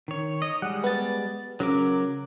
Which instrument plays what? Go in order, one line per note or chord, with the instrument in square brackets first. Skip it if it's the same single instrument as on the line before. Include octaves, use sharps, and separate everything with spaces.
[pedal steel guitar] D#3 C#5
D#5
[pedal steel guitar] G3 G#3 [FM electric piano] F#5
[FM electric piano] B3 A6
[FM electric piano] C#3 [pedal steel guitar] F#3 A#4 D6